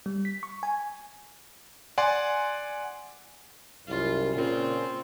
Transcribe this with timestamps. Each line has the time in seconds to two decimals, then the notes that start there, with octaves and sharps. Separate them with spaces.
0.06 G3
0.25 B6
0.43 C#6
0.63 G#5
1.98 D5 F#5 G#5 C6
3.87 C2 F#2 F4
4.35 A#2 C#3 C4 F4